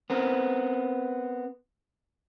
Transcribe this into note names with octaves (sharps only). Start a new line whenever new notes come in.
B3 C4 A#4